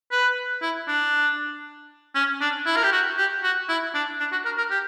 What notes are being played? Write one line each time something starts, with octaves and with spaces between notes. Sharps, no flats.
B4
E4
D4
C#4
D4
E4
A#4
G4
F#4
G4
F#4
E4
D4
D4
F#4
A#4
A#4
G4